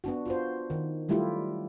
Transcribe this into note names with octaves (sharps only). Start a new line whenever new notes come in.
B3 D4 F#4
F4 F#4 C5
D#3
F#3 G3 A3 E4 F4 G4